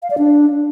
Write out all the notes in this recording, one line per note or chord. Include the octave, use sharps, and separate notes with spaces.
F5
D5
D4